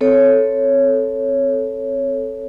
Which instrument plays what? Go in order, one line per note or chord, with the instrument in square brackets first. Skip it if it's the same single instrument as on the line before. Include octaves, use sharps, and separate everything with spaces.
[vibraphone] C4 A4 C#5